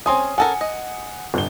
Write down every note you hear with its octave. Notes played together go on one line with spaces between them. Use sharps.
C4 C#4 G#4 G#5 C6 D#6
C#4 A4 A#4 F#5 G#5
D#5
G1 G7